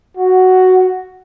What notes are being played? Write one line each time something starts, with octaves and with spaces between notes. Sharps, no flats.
F#4